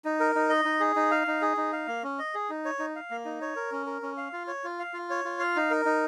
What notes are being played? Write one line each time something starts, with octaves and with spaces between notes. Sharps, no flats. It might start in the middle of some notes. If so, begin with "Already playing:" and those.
D#4
A#4
D#4
D#5
D#4
G#4
D#4
F5
D#4
G#4
D#4
F5
A#3
C#4
D#5
G#4
D#4
C#5
D#4
F5
A#3
D#4
C#5
A#4
C#4
A#4
C#4
F5
F4
C#5
F4
F5
F4
C#5
F4
F5
D#4
A#4
D#4